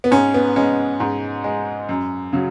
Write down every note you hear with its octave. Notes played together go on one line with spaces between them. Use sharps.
B3
G#2 C#4
B3
G#3 C#4
G#2
G#3
F#2
C#3 F#3